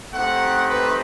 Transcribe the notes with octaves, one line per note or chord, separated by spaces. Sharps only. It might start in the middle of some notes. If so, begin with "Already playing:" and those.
A3 C4 D#4 G4 F#5
B4